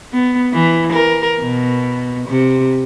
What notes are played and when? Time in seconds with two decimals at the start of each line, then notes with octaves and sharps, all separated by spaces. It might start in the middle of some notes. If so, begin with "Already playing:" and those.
0.12 B3
0.53 E3
0.93 A#4
1.40 B2
2.28 C3